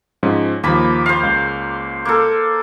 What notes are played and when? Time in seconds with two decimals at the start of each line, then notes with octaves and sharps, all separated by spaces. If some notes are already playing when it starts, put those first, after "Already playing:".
0.23 G#2 F3 C#4
0.63 D#2 F3 A#3 B5 D6
1.06 C5 F5
1.23 C#2
2.05 A#3 A4